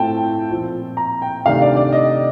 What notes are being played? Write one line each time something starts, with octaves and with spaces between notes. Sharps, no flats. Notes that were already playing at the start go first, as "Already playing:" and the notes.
Already playing: A2 A3 C4 F4 G5 A5
A#2 F3 C4 F4
A#5
G5
C3 D#3 A3 D4 F5
D5
D5
D#5